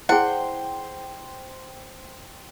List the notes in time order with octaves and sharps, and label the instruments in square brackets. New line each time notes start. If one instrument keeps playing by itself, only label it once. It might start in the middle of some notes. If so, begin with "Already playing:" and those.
[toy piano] E4 G#4 [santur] C5 G5 [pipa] F#5